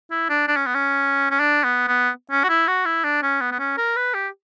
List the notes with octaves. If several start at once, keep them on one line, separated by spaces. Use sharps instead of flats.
E4
D4
D4
C#4
B3
C#4
C#4
D4
B3
B3
C#4
F#4
E4
F#4
E4
D4
C#4
B3
B3
C#4
A#4
B4
G4